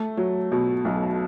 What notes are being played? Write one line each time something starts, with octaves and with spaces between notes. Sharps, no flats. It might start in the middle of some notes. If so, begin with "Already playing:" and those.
Already playing: A3
F#3
B2
B1